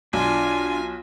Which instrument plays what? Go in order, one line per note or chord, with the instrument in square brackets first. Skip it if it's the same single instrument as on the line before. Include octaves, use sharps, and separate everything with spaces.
[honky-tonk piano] B1 [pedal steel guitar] D4 [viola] F4 G#5